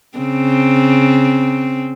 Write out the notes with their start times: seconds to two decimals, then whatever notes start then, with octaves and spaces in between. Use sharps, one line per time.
0.18 C#3 C4